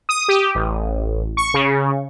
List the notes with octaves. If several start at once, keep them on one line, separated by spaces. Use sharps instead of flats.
D#6
G4
A1
C#6
C#3